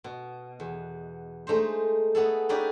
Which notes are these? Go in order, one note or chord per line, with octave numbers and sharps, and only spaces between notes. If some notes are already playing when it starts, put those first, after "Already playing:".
B2
E2
G#3 A3 D#4 C5
A3 B3 G#4 A4
C#4 D#4 G4 G#4 B4 D5